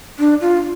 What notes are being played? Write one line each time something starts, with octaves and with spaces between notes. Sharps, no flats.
D4
F4